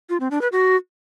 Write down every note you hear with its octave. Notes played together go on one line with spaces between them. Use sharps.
F4
C4
D4
B4
F#4